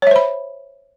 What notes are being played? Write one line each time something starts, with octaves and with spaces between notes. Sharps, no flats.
C5 C#5 E5 B5